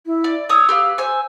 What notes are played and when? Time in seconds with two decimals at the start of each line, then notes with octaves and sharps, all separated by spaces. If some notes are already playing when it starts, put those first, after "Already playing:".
0.06 E4
0.24 D5
0.49 C#5 D#6 E6
0.69 G4 B4 F5
0.98 C5 G#5 E6